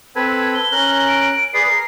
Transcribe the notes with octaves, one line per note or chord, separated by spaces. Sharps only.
C4 A4 B4 G#6
G7
C#4 A#4 F#6
D7
G#4 B4 D5 C7
A#4